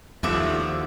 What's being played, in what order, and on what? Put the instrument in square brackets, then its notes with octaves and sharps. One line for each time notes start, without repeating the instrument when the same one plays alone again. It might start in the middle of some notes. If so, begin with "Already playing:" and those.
[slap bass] D#2 [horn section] D3 F3 A3 [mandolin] F#4 E5 D6